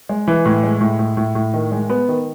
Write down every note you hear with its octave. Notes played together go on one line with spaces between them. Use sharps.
G#3
E3
A2
G#3
A2
A2
A2
A2
D#3
G#3
B3
D#3